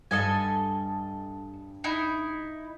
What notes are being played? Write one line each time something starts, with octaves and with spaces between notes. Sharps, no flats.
G2 A4 D#5 F5 G#5
D#4 E4